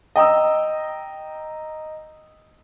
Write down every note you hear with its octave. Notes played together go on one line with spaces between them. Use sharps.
D#5 G5 A#5 D#6 E6